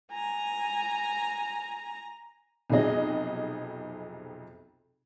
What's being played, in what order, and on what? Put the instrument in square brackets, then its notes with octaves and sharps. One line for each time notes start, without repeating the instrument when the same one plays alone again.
[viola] G#5 A#5
[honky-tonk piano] B1 F2 C3 G#4 D#5